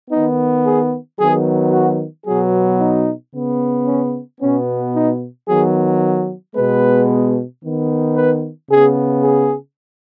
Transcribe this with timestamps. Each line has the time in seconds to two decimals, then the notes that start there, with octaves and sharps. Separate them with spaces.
0.10 D#3 B3 D#4
0.65 G#4
1.18 D#3 F#3 B3 G#4
1.72 F#4
2.25 B2 F#3 B3 G#4
2.80 D#4
3.33 C#3 B3
3.86 C#4
4.40 B2 B3 C#4
4.93 D#4
5.48 D#3 F#3 B3 G#4
6.55 B2 G#3 B3 B4
7.62 D#3 B3
8.16 B4
8.70 C#3 B3 G#4
9.24 G#4